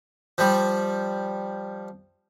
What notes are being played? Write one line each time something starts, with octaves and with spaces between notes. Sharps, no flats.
F3 G3